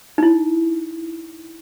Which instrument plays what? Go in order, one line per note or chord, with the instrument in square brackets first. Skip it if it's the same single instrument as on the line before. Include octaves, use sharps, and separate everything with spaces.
[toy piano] D#4 E4